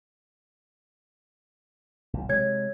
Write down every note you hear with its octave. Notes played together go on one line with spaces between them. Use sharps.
B1
C3 G#3 C#5 G#6